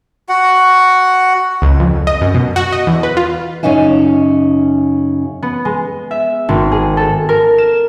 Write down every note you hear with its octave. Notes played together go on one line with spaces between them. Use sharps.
F#4 F#5
C#2
F2
D#5
F#2
B2
F#4
D#5
E2
B4
F4
F#2 C#3 C#4 D#4 E5 G#5
B3
G#3
E5
G#1
G#4
A4
A#4
E7